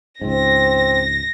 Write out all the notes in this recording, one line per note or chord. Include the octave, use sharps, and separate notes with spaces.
C#2 G#2 C4 A#6